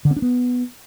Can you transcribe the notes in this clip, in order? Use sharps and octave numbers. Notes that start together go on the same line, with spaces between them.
D3
C4
D4
B3